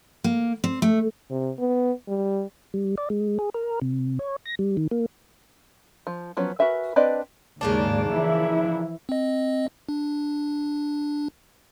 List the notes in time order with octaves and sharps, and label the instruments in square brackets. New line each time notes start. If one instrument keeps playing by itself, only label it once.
[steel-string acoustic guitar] A#3
C4
A3
[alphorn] C3
B3
G3
[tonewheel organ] G3
D5
G#3
G#4
A#4
C3
C#5
A#6
G3
D#3
A#3
[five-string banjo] F3
F3 F#3 B3 C#4
F#4 A#4 B4 E5 G#5
C4 D4 B4 D5 D#5
[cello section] D#2 G#2 D5 [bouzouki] C#3 A#3 D4
[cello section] E3 F3 E4
[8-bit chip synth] C4 D#5
D4